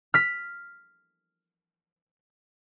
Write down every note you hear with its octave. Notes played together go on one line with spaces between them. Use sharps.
F6 B6